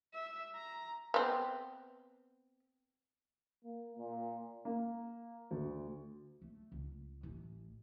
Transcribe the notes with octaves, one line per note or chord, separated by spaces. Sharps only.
E5
A#5
B3 C4
A#3
A#2
A#3
D2
A3
C#2
A1